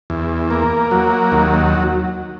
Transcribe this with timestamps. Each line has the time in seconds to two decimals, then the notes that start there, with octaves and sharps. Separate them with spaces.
0.10 E2
0.51 A#3
0.91 F#3
1.32 D#2